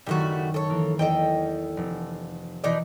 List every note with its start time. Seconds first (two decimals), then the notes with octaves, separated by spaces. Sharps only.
0.06 F#1 D#3 G3 A3 F#4
0.54 A4 C#5
0.70 E3 A#3
0.99 E2 A4 D#5 G5
1.77 F1
2.64 B2 E3 D#4 D5